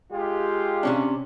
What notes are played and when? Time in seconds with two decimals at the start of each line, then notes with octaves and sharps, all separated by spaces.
0.12 G#3 F4 G4
0.83 C3 C#4 D4